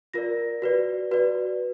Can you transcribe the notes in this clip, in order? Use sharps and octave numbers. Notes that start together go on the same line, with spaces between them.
F4 A#4 D5 A#6
F#4 B4 D5
F#4 B4 D5